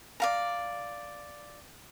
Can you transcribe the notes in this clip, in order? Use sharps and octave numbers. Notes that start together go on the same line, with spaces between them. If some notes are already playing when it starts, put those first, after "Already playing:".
D5 F5 A#5